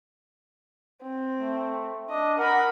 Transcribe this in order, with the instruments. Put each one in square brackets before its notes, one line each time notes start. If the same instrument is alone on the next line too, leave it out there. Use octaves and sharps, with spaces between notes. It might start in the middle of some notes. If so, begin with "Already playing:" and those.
[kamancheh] C4
[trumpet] A3
[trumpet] D4 [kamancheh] D#5
[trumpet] A#4 [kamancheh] F#5 B5